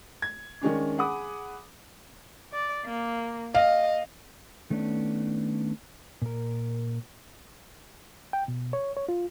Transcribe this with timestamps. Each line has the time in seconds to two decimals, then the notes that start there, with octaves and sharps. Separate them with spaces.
0.22 G#6
0.61 D#3 G#3 C#4 D4
0.98 G#4 F#5 B5 D6 D#6
2.53 D5
2.85 A#3
3.55 D#5 F5
4.70 D#3 A3 B3 C#4 D4
6.22 A#2 A#4
8.33 G5
8.48 B2
8.73 C#5
8.97 C#5
9.09 F4